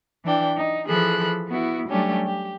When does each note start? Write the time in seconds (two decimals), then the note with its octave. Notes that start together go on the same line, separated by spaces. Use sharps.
0.24 E3 D4 G5
0.57 D#4
0.88 E3 F3 G#4 A4 B5 F#6
1.47 B3 E4 F#4
1.88 F#3 G3 A3 C#4 D4 G4
2.25 G4